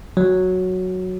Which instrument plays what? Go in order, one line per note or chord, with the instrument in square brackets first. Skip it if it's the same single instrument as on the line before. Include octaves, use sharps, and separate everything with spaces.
[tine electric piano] F#3